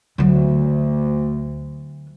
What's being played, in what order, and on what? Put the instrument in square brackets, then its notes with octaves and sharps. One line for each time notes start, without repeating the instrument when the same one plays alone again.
[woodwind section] D2 [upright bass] D3 F#3